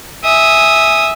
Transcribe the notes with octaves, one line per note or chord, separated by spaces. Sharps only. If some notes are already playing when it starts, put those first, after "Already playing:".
E5 G#5 D#6